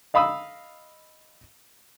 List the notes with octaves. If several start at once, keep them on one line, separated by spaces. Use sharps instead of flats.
D#5 F5 B5 D#6 E6